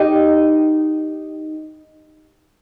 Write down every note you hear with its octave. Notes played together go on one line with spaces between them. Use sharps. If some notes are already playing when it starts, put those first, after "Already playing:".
Already playing: D#4 G4